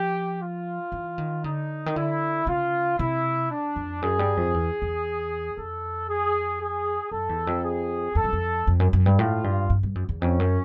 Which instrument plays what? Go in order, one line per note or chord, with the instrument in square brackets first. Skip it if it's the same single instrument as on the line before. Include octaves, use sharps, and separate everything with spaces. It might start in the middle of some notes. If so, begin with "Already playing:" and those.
Already playing: [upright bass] F3 [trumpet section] G4
[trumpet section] F4
[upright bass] E3
D#3
[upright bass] D3 [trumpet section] D#4
[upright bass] D#3
[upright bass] D3 [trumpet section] E4
[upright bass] C#3 [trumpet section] F4
[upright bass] C3 [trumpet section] E4
[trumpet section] D4
[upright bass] F2
[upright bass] F#2 [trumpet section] G#4
[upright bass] G2
F2
E2
E2
[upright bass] F2 [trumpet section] A4
[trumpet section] G#4
G#4
[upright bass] F#2 [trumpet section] A4
[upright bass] E2
F2
[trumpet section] G#4
[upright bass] F2 [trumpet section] A4
[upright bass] F#2
F2
F2
F#2
F#2
G2
[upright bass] A2 [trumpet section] F4
[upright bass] G2
G2
G2
F#2
E2
[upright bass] F2 [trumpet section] C#4
[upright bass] F#2